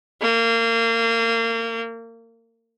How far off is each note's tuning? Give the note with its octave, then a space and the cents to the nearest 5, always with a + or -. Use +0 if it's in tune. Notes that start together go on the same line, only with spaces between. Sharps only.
A#3 -30